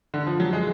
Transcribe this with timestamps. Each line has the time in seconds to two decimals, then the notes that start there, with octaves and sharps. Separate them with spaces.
0.14 D3
0.27 F3
0.40 F#3
0.53 G#3